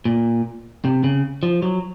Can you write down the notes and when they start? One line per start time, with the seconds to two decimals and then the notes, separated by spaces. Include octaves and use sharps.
0.05 A#2
0.85 C3
1.04 C#3
1.43 F3
1.62 F#3